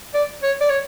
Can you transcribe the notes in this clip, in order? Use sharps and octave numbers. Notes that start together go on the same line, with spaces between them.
D5
C#5
D5
C#5